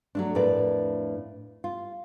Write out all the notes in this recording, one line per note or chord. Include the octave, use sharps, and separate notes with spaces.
F#3 A3 D4
F2 A2 D4 A#4 B4 D5
F4